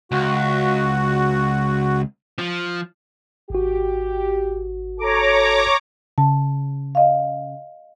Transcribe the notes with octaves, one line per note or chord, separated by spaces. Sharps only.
C#2 F#4
F3
G#1 F#4 G4
A4 C#5 A#5 D6
C#3 A5
D#5 F5